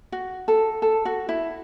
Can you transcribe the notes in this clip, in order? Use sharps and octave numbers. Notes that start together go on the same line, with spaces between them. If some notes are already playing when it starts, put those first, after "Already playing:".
F#4
A4
A4
F#4
E4